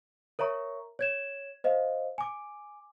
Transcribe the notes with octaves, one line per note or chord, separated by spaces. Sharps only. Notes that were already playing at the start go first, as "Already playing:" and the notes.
A#4 C#5 E5 A#5 C#6
C#5 G#6 E7
C5 D#5 F5
G#5 D6